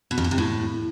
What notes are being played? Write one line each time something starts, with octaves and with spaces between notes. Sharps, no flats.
B2
F2
A#2
C3
A2